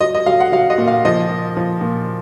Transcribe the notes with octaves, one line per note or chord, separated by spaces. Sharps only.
F#3 D#5
D#5
F#3 F5
F#5
F#3 F5
D#5
A#2
F5
F3 D#5
A#2
F3
A#2